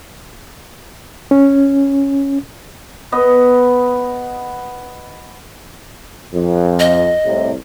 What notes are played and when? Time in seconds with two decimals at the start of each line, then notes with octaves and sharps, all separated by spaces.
1.31 C#4
3.12 B3 D#5
6.34 F2
6.79 D#5
7.25 C2 A2 C3